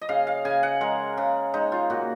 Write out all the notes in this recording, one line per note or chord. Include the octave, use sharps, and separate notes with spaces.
D#5
C#3 F5
F5
C#3 G#5
F#5
G#3 A#4
C#3
G#3 D#4
F4
A#2 F#4